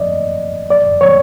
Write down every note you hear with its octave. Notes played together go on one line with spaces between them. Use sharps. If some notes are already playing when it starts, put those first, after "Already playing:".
Already playing: D5 D#5
D5
C#5